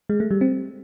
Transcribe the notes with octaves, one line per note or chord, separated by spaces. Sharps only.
G#3
A3
G3
C4